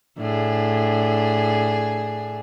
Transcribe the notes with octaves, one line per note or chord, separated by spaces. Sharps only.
A2 D4 G#4